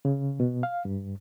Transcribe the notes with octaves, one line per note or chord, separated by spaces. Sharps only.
C#3
B2
F5
G2